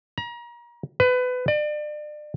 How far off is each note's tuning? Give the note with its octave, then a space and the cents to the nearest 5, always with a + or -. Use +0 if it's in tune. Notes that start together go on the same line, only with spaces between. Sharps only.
A#5 +35
B4 +25
D5 +35